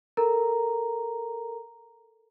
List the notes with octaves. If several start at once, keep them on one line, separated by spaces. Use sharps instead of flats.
A4 A#4 A#5